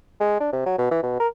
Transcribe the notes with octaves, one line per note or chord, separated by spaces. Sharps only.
G#3
D4
C3
F#3
B2
E3
B2
A#4